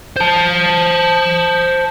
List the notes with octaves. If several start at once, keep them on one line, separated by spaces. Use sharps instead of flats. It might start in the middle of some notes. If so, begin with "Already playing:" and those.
C5 A5